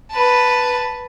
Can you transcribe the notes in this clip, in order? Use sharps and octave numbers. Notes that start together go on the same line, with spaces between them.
B4 A5